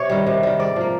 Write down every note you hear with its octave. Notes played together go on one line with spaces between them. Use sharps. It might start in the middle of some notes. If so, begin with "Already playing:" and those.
Already playing: C3 C#5
D#3 G3
C3
D#3 G3
G#2 D5
F3 A#3